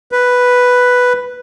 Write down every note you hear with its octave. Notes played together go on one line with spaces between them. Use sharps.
B4